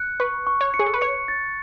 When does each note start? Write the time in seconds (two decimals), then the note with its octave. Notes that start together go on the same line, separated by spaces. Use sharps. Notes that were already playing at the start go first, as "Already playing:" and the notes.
Already playing: F#6 C#7
0.20 B4 C#6
0.47 C#6
0.61 C#5
0.74 C#7
0.79 G#4
0.86 A4
0.94 B4
1.01 C#5 C#7
1.28 A6